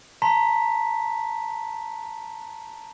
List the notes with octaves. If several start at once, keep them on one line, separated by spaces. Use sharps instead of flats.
A5 A#5 C6 B6